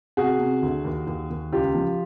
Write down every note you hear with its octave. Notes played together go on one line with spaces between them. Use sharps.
C3 F#4 G#4
C3
D2
D#2
D#2
D#2
C#2 F4 G4
F3